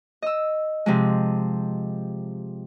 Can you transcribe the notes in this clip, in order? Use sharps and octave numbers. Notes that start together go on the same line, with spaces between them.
D#5 E6
C3 F3 G#3